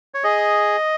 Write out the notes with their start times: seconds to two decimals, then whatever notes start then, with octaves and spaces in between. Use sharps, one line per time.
0.14 C#5
0.24 G#4 D#5